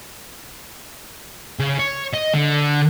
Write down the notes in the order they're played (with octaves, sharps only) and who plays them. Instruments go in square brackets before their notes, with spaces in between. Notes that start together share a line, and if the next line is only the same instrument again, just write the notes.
[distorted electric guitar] C#3
C#5
D#5
D3